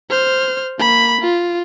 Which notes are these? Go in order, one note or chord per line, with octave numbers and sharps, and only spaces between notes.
C5 F6
A#3 B5
F4